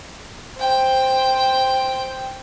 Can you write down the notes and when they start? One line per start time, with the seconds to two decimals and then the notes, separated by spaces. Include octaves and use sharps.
0.57 C5 G5